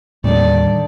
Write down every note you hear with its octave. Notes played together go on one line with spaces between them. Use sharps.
D#2 A2 D3 D#3 G3 D5